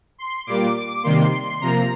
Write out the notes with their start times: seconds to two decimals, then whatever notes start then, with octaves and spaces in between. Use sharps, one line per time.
0.18 C6
0.47 A#2 G3 A#3 D6
0.75 D6
1.03 C3 D#3 G3 A#3 C6
1.61 C3 F3 A#3 A#5